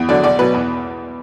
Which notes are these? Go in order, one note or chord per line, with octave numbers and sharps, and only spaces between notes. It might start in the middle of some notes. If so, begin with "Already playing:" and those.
Already playing: E2
D3 F#3 D5
B1 D5
B2 F#3 B4
E2